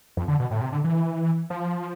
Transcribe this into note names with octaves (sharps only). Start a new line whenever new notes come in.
F2
D3
B2
A2
C3
D3
E3
F3